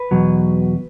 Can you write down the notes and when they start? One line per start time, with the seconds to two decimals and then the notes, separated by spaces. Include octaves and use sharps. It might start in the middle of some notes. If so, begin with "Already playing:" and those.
Already playing: B4
0.11 E2 B2 F#3